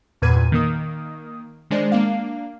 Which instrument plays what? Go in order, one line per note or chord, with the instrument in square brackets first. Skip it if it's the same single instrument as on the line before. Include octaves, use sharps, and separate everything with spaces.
[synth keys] E2 G2 A#2 B4 G#6 D#7
D#3 A#3 D#6
D#3 G#3 D4 C5 D5
A#3 D4 F5